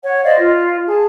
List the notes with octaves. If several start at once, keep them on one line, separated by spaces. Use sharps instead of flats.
C#5 F#5
C5 D5 D#5 F5
F4
G#4 A5